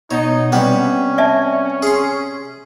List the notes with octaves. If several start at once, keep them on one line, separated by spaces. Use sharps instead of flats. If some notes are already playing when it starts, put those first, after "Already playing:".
B2 D#4 C#5
C3 G3 B3 C#4
D5 E5 A5
G#4 C6